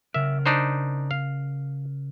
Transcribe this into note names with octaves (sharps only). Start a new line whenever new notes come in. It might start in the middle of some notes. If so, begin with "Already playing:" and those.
C#3 A#4 E5
D4 D#4 C5
F5